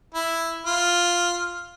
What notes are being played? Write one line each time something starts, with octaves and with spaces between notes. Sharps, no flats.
E4
F4